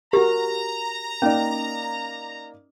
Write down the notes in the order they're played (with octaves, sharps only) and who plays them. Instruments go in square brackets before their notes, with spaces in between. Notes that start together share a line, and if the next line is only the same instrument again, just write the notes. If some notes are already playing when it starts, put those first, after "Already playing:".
[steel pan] F#4 A#4 [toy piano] G4 [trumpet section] A#5
[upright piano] A#3 D#4 D5 [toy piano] C#4